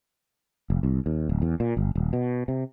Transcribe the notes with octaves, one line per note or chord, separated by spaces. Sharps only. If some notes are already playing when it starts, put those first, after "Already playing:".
F1
C2
D#2
D1
E2
A#2
G1
D#1
B2
C3